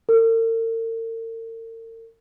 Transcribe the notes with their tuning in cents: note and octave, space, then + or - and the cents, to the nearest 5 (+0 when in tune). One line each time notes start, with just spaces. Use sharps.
A#4 -45